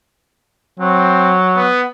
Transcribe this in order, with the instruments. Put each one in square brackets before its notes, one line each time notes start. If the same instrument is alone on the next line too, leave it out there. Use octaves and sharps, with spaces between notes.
[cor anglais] F#3 [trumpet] C4
[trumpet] B3